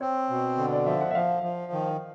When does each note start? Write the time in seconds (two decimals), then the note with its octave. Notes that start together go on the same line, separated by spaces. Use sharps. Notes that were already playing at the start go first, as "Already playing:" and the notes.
0.01 C4 C#5
0.30 B2
0.58 D3
0.73 D5
0.86 F3 E5
1.01 F#5
1.11 E5
1.15 F3 F5
1.43 F3
1.72 D#3